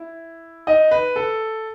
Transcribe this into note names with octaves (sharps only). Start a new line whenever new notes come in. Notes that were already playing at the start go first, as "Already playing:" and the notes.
Already playing: E4
D#4 D#5
B4
A4